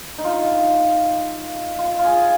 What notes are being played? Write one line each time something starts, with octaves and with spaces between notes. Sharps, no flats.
D#4
F4
F4
F4
G#4